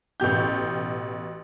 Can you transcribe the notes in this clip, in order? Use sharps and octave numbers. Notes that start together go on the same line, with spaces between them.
A1 B2 G4 G6